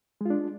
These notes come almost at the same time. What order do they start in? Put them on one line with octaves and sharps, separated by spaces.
G#3 F4 D4